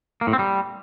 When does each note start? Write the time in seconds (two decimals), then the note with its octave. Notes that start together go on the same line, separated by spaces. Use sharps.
0.21 A#3
0.27 A2
0.33 C4
0.39 G3